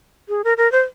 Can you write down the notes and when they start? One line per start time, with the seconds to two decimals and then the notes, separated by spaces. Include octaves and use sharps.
0.29 G#4
0.44 A#4
0.57 A#4
0.72 C5